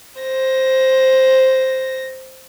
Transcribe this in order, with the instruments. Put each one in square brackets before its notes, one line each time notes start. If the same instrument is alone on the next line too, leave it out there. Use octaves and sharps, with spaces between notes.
[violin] C5 A#6